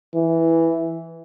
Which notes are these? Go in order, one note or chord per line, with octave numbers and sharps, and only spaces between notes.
E3